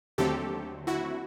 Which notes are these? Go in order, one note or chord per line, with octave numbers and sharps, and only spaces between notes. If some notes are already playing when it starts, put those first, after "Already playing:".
D#2 D3 F#3 A3 C4 G4 A4
E4 F#4